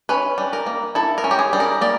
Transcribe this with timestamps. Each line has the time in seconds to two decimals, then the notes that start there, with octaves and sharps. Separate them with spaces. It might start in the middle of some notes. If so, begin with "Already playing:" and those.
0.09 C#4 B4
0.38 G3
0.53 A#4
0.66 A#3
0.95 E4 A4
1.18 A#4
1.24 C#4
1.31 G4
1.39 G#4
1.53 G3
1.60 A#4
1.81 A#3 D5